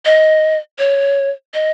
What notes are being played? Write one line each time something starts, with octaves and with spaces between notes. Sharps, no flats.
D#5
C#5
D#5